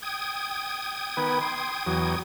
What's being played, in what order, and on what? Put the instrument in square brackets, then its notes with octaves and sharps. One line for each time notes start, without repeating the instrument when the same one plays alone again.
[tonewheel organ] G5 D#6 G#6
[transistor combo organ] D#3 B3 B4
C6
E2 F#3